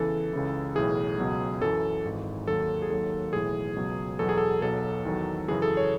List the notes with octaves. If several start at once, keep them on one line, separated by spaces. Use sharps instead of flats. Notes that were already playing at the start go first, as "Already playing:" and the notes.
Already playing: E2 C#3 E3 A4
C#2 C#3 E3
B1 A2 E3 G#4
C#2 B2 F#3
F#2 E3 A4
G#1 G#2 E3
D#2 D#3 F#3 A4
G#4
D#2 D#3 F#3 A4
B1 A2 E3 G#4
C#2 B2 F#3
E2 B2 F#3 A4
G#4
A4
B1 B2 F#3 A4
E2 D#3 F#3
F#2 C#3 E3 G#4
A4
C#5